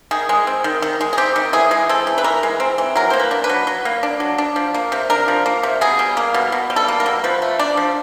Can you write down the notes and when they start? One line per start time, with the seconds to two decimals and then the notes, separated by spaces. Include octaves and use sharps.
0.11 D#3 G#4
0.29 G#3
0.47 C4
0.64 D#3
0.82 D#3
1.01 G#3
1.13 G#4
1.18 C4 G4
1.36 D#3
1.53 E3 G#4
1.71 G#3
1.89 C4 A4
2.07 E3
2.18 B4
2.24 E3 A#4
2.43 G#3
2.60 C4
2.78 E3
2.96 F#3 A#4
3.10 A#3 C5
3.19 B4
3.31 D4
3.44 B4
3.49 F#3
3.67 F#3
3.85 A#3
4.03 D4
4.20 F#3
4.38 D4
4.56 F3
4.74 A#3
4.92 C3
5.10 D4 A#4
5.28 F3
5.46 A#3
5.63 C3
5.81 B2 G#4
5.99 G3
6.17 A#3
6.34 B2
6.52 B2
6.70 G3
6.76 A4
6.88 A#3
7.00 A#4
7.06 B2
7.24 F3 B4
7.42 A3
7.59 D4 D5
7.77 F3